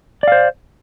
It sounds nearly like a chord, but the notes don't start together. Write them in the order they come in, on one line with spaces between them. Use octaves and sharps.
D5 F5 C5